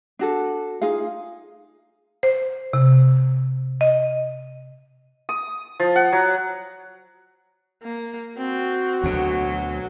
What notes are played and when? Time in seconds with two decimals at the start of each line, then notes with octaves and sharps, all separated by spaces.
0.19 D4 F#4 A4
0.82 D#4 F4 G#4 F5
2.23 C5
2.73 C3
3.81 D#5
5.29 D#6
5.80 F3
5.96 F#5
6.12 F#3
7.83 A#3
8.37 C4 F#4
9.04 D2 B2 F#3